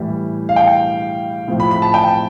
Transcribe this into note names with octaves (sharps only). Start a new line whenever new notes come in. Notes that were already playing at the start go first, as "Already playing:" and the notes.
Already playing: A2 E3 G3
F5
G5
A2 F3
B5
B5
A5
G5